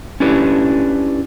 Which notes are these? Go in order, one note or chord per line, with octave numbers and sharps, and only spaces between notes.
C#4 D4 E4 G4 B4